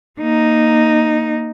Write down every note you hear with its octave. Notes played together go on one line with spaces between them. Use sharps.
A#3 D#4